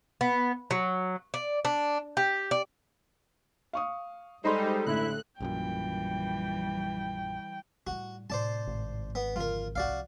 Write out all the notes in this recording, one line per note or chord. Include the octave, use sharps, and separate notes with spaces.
B3
F#3
D5
D4
G4
D5
F5 C#6 D#6
G3 G#3 D#4 A4 C5 D#5 B5 C6
A1 D3 E4 F#6
A#1 F#2 A#2 E3 G3 G5
A2 G3 F#4
A2 C3 C5 D5 A5
G#1
B3
F2 D3 F4 A#4
C2 F3 F#4 D5 F5